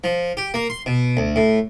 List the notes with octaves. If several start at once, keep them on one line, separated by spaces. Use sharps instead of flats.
F3
G4
A#3
C6
B2
D2
A2